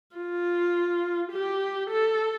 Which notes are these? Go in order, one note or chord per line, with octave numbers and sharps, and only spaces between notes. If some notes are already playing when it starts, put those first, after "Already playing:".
F4
G4
A4